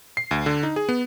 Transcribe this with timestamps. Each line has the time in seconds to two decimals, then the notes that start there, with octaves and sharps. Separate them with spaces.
0.17 C7
0.31 D2
0.46 D3
0.63 D#4
0.76 G#4
0.89 B3